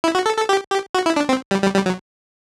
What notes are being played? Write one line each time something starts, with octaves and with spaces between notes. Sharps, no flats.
E4
F#4
A4
A4
G4
G4
F#4
E4
D4
C4
G3
G3
G3
F#3